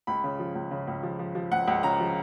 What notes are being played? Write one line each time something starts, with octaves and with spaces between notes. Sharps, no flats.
C#2 B5
C#3
F3
C#2
C#3
C#2
F3
F3
F3
C#2 F#5
C#2 F#5
C#3 A#5
F3